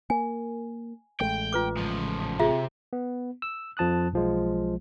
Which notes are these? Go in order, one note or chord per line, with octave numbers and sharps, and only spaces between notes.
A#3 G#5
A1 G#3 A3 G5
F4 B4 D6
C#2 F3
C3 F4 G#4 E5
B3
E6
F2 F3 A5 D#6 F#6
B1 F3 G#3